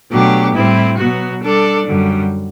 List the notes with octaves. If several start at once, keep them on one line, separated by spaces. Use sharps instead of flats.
B2 F#3 A3 D4 G4
A2 G3 C4 E4
B2 F#3 B3 F#4
G3 D4 A4 D5
F#2 D3 G3